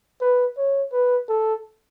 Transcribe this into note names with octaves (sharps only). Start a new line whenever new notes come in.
B4
C#5
B4
A4